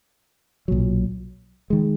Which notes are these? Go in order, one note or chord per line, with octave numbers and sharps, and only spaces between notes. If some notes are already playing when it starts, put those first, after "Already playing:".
B1 A#2 F#3
D#3 G#3